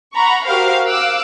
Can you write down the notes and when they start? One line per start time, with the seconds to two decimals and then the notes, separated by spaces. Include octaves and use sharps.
0.13 F#5 A#5 B5 C#6
0.45 F#4 G4 A#4 C5 F5
0.86 F5 D6 E6 F#6